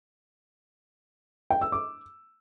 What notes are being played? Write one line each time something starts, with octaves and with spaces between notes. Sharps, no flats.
G5
E6
D6